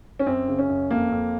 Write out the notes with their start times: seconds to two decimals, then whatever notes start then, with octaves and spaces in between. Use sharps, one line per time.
0.19 C#4
0.27 F#2 C4
0.48 C#3
0.59 C#4
0.69 F#2
0.91 F2 A#3
1.12 F2